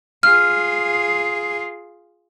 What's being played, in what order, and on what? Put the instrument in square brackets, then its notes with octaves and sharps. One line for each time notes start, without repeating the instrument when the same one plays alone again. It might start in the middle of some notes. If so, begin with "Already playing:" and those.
[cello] F4 G#4 [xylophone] F6